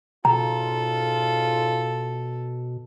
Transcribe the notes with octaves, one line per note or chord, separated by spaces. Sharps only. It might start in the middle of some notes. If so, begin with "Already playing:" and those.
G#2 B2 C#4 F4 A4 A#5